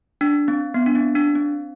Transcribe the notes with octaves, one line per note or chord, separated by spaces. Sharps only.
D4
C4
B3
D4
C4
D4
C4